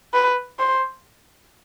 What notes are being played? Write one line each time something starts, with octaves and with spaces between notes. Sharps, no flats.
B4
C5